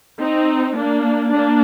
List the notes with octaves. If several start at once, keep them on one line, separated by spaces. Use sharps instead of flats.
C4 D#4
A#3 D4
A#3 D4